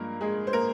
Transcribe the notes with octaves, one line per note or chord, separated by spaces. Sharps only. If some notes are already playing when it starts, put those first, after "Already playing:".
Already playing: G2 F3 G#3 A#3 A#4
G#3 G#4
C5
A#3 A#4